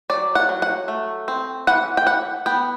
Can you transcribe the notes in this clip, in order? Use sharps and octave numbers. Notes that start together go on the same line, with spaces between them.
F#3 D5
F#5
F#3
F#5
A3
C4
E3 F#5
G5
E3 F#5
B3 G5